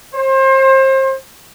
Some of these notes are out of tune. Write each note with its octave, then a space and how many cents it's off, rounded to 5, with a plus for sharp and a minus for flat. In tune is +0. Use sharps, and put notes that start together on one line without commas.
C5 +30